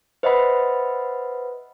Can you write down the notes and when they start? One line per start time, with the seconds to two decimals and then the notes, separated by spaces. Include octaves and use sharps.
0.23 B4 C5 D#5 E5 F#5 B5